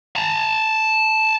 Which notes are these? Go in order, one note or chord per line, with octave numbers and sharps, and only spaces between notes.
A5 A#5